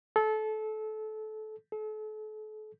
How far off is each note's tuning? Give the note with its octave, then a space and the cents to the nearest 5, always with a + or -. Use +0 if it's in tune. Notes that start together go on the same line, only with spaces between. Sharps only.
A4 -25
A4 -40